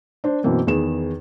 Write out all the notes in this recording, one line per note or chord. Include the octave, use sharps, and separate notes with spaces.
D4 C5
F#2 B2 E3 A#3 C4
E2 D#3 G#4 B4 E7